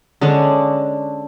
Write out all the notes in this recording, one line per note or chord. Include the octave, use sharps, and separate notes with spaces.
D3 G#3 C#4 D4